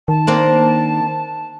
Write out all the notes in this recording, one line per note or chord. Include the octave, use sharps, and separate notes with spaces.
D#3 A5
A#3 C4 D4